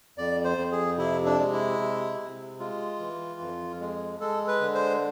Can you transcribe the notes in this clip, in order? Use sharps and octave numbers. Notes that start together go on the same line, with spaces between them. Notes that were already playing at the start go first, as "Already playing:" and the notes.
F2 D5
C5
F2
G#4
C3 E4
D4
G#3
E4
C3
C3
G#3 F4
E3
F2
G#3
G#3 A4
B4
D3
C5